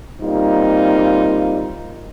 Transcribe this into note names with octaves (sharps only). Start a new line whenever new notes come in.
G3 A#3 C4 D#4 F4